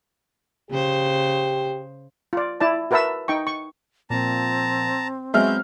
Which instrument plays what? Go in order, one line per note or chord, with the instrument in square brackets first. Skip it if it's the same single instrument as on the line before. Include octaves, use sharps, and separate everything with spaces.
[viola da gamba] C#3 C5 [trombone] G4
[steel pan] F4 D5
E4 D5 A5
F#4 A#4 B4 E5 A5 E6
D#4 G5 C#6
C#6
[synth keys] A#2 F3 [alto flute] C4 [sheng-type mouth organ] A5 A#5
[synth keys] F#3 B3 C4 [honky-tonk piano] G#3 E5 F6 [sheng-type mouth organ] G6